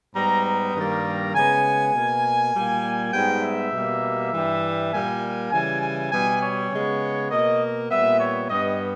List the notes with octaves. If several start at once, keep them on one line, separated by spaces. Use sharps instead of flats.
G#2 G3 B3 A#5
A#5
G2 D#3 G3 A#3
C#3 G#3 B3 G#5
B2 A#3
A#2 G3 A#3
G#2 G3 B3 G5
E5
B2 G3 A#3
G2 E3 G3
A#2 G3 A#3 G#5
C#3 E3 G3 G#5
G#5
B2 G3 B3 G#5
C#5
C#3 G#3 B3
B2 A#3 D#5
A#2 G3 B3 E5
C#5
G2 G3 B3 D#5